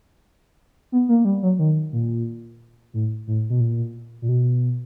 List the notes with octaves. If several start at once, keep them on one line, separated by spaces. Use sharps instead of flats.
B3
A#3
G3
F#3
D#3
A#2
A2
A2
B2
A#2
A#2
B2